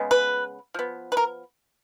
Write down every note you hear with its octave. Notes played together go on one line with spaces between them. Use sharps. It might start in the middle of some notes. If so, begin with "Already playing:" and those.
Already playing: C#3 G#3 B3
B4
F3 B3
B4
A#4